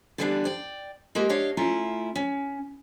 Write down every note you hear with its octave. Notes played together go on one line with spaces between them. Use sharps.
D3 E3 G3 B3 C#4 D4
D5 G5
G#3 A#3 G4 A#4
D4 G4 C#5 D#5 F5
A3 C#4 E4 F4 A#5
C#4